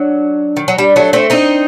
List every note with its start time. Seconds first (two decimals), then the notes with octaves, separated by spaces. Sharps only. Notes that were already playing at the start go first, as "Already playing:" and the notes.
Already playing: F#3 D4
0.57 D#3
0.68 F#3
0.78 G3 D4
0.96 F#3 A3
1.13 A3 C4
1.30 C4 D4 D#4